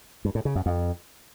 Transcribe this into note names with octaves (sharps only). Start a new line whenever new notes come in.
G2
A2
C#3
F#2
F2